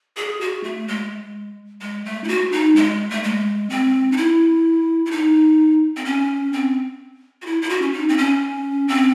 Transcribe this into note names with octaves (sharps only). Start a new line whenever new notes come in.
G#4
F#4
A3
G#3
G#3
A3
E4
F#4
D#4
G#3
A3
G#3
C4
D#4
E4
E4
D#4
C4
C#4
C4
F#4
E4
E4
F#4
C#4
D#4
C4
C#4
C4